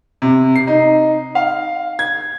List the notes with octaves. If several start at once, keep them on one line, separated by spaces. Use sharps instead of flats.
C3
C7
D#4
F5
G#6